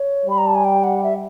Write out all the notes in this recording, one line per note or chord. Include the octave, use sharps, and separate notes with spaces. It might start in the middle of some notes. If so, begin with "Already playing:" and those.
Already playing: C#5
G3 B5
A#5
A5
G#5
G5
F#5
E5